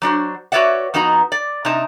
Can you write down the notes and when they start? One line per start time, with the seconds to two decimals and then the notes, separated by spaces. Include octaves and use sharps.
0.02 F#3 D4 F#4 C5
0.52 F#4 B4 C#5 D5 E5 F#5
0.94 F2 B3 D#4 F#4 A#5
1.32 D5
1.65 C3 D#4 A5